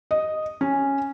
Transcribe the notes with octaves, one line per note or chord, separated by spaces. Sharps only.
D#5
C#4